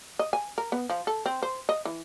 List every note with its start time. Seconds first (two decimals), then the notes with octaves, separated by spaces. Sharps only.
0.19 D#5
0.33 G#5
0.58 A#4
0.72 B3
0.90 F3
1.07 A4
1.26 C4
1.43 C5
1.69 D#5
1.85 E3